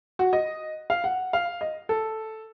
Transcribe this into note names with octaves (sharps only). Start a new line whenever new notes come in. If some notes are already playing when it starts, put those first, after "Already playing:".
F#4
D#5
F5
F#5
F5
D#5
A4